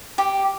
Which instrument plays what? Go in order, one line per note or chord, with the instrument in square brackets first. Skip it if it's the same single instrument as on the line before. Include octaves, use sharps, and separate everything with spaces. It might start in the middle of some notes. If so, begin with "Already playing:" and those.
[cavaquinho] G4